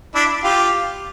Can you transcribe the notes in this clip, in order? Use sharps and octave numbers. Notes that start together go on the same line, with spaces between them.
D4 E4
F4 G4